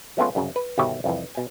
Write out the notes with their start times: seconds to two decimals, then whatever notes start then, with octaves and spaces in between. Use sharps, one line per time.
0.17 F3 G#3 A3 B3 C#4 F4
0.35 C2 F#2 C#3
0.56 B4
0.78 G1 B2 D#3 G4 C#5 E5
1.04 C2 F2 E3
1.35 B2 G#5